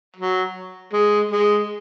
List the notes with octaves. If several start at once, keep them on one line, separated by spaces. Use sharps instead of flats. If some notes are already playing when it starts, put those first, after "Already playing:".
F#3
G#3
G#3